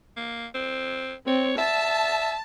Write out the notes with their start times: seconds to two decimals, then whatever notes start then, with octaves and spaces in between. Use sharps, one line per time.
0.17 A#3
0.55 C4
1.27 C4 C#5
1.58 E5 A5